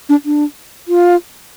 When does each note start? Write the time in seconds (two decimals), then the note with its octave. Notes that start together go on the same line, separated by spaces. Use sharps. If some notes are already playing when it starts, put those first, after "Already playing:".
0.09 D4
0.25 D4
0.88 F4